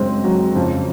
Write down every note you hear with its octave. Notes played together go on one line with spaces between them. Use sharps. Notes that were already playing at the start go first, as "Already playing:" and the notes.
Already playing: F#2 C#3 G#3 C4
F#3
F2 C#3 F3